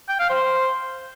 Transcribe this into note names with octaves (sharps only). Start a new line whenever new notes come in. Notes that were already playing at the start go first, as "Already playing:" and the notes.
G5
F5
C5